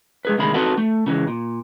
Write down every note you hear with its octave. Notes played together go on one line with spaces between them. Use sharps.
G#3 G#4 B4
D2 C3 D#3 G#3 B5
C4 D#4 F#4 A4 B4 F#5
A3
C#3 E3 G#3
A#2